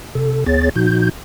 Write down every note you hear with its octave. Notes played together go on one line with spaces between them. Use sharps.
C3 A4
D2 B3 G#4 C#5 A6
A#2 F3 D#4 F#4 G6